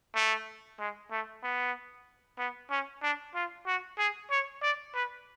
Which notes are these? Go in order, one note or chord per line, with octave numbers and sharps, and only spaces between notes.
A3
G#3
A3
B3
B3
C#4
D4
F4
F#4
G#4
C#5
D5
B4